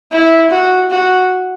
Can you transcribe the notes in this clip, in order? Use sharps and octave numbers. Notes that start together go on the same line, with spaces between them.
E4
F#4
F#4